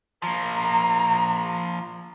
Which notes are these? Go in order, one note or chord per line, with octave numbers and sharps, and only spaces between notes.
F3 A#3 A#5